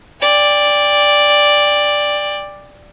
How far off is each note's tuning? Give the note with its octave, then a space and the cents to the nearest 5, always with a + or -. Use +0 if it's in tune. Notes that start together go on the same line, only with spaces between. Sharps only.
D5 +0 G5 +30